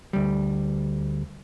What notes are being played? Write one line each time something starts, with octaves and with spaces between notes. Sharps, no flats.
D2 G3